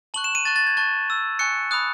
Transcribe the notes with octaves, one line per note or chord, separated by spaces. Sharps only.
A5 C#6 F#6 F#7
E7
D#7
A5 C#6 F#6 A6
A6
G#6
A5 C#6 F#6 A6
A5 E6
G#5 C#6 F#6 C#7
B5 D#6 F#6